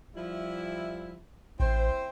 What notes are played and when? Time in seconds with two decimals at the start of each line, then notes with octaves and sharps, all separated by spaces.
0.16 F3 G3 E4
1.60 A1 C4 E4 C5